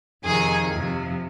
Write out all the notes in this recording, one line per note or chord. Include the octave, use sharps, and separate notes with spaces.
F2 C3 D#3 G#4 G#5
F2 C3 F3